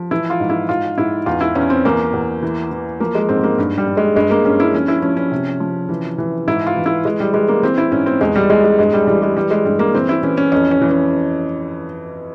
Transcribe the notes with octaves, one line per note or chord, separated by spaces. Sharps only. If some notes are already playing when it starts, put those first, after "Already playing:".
Already playing: F3
E3 E4
F4
G#2
E4
G#2 F4
G#2 E4
E2 F4
E4
E2 C#4
C4
E2 A#3
E2
E3
E3
F3 A#3
G#3
G#2 C4
A#3
G2
G3
G2
G#3
G2 G#3
A#3
G2 C#4
E4
F3 C#4
E4
F3 C#4
C#4
C3
F3
E3
E3
G#2 E4
F4
E3
E4
E3 G#3
G3
E3 G#3
A#3
E3 C4
E4
G#2 C#4
C4
E2 G#3
G3
E2 G#3
G#3
G2 G#3
G3
E3 G3
G#3
E3 G3
G#3
G2 G3
A#3
E3 C4
E4
E3 C#4
C#4
F2 C#4
C#4
E3
C#4